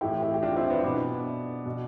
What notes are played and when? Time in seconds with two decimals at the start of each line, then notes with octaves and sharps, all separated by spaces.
0.01 A2 E3 E4 G4
0.22 E4 G4
0.34 G4
0.43 D4 F4
0.56 C4 E4
0.70 B3 D4
0.79 E4
0.84 B2 B3 D4
1.66 B2